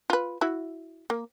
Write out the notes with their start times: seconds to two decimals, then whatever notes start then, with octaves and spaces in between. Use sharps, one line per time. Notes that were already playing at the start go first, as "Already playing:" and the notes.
0.10 F4 B4
0.41 E4 F#4 E5
1.10 A#3